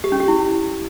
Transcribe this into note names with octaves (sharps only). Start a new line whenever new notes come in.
G4
C#4
G4
E4